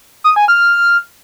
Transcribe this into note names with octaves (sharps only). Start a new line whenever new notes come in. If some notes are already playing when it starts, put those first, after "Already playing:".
D#6
G#5
F6